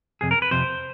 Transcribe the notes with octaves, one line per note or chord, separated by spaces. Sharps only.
F2 C3 G#4
A#4
B4
F2 C3 C5